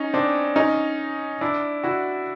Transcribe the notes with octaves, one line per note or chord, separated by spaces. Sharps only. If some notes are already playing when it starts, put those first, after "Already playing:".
Already playing: C#4 D#4
C4 D4
C#4 D#4
D4 E4
E4 F#4